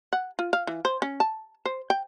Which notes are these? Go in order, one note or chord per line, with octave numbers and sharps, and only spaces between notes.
F#5
F4
F5
E3
C5
C#4
A5
C5
G5